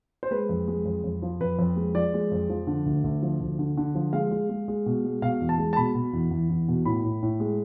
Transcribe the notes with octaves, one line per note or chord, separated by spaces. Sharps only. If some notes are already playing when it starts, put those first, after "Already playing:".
C5
G#3 B4
F2
G#3
F2
F2
F3
F2 B4
F2
G#3
F3 D5
G#3
F2
F3
D3
D2
D2
F3
D2
D3
D3
F3
G#3 F5
G#3
G#3
G#3
B2
G#3
B2 F5
E2
A5
G#3
A5
B2 B5
B2
E2
E2
E2
B2
A2 B5
A2
A2
G#3